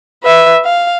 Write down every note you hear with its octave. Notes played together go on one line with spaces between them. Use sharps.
B4 E5
F5